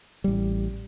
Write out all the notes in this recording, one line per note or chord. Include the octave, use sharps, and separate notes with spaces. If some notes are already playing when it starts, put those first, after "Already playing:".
A1 G3